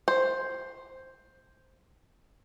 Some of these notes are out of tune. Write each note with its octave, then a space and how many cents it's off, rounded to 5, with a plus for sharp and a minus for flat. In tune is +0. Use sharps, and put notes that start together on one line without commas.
C5 +5